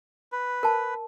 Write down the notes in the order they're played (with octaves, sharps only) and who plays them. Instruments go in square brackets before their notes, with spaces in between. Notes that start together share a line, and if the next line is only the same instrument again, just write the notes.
[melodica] B4
[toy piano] A#4 A5